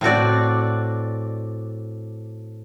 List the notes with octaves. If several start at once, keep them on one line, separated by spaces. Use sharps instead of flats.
A2 C4 F#4 D5